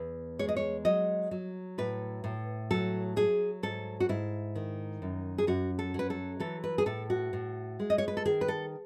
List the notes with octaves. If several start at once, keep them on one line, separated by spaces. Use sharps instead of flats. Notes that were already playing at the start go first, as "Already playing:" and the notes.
Already playing: E2
G#3 C#5
D#5
C#5
F#3 D#5
F#3
A2 B4
A2
F#3 A4
F#3 G#4
G#2 A4
F#4
G#2 E4
D#3
F#2
G#4
F#2 F#4
A4
F#3 B4
A4
E3 A4
B4
G#4
A2 A4
F#4
A2
G#3
D#5
C#5
B4
A4
D#3 G#4
B4
A4